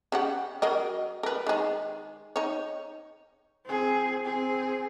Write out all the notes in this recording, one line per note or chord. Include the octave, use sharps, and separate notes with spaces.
C#3 G4 F#5
F#3 A#4 D#5
A#4 B4
D#3 G#3
D#4 C#5
C4 G#4
C4 G#4